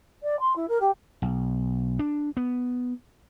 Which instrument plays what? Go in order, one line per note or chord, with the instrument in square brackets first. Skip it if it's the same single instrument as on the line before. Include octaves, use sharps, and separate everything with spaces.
[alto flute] D5
C6
E4
A#4
G4
[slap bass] B1
D4
B3